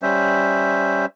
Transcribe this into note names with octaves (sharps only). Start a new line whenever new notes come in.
G3 C#4 C5 E5